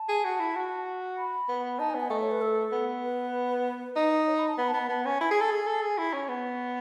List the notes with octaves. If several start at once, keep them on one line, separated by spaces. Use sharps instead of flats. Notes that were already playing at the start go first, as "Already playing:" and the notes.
Already playing: A5
G#4
F#4
E4
F#4
B5
B3
D#4 A5
G#5
B3
G#5
A3 D#5
C#5
B4
A4
B3
B4
D#4
C#5
B5
A5
B3 B5
A5
B3 B5
B3 A5
C#4 G#5
E4 G#5
G#4
A4
G#4
A4
G#4
E4
C#4
B3